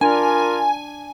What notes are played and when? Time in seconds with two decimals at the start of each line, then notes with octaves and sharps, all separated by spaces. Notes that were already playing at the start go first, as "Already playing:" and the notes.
0.01 D4 F4 A#4 G#5